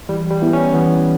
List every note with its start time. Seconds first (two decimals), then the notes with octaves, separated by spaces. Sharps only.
0.09 E3 G3
0.31 G3
0.42 B3 E4
0.53 C#4
0.74 E3 B3